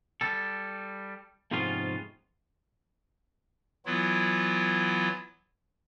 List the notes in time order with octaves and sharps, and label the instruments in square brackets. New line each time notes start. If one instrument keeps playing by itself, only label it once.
[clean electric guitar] G3 A4
F2 G#2 C3 B3 C#4 F4
[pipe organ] E3 F#3 B3 E4 F4